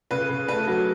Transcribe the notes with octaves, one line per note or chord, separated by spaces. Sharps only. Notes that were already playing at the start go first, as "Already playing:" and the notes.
C#3 B4
C#3
A3 B4
F#3